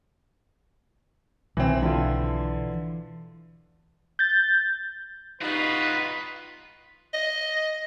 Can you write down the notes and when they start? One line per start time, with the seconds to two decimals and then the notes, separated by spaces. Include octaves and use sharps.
1.57 B1 D#3 E3 C4
1.82 D3 E3 E4 F4
4.19 G6 A6
5.41 G3 D#4 F4 F#4 B4
7.14 D#5